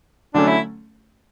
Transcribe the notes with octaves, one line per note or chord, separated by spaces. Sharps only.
D3 F#3 A3 C#4 D4
E4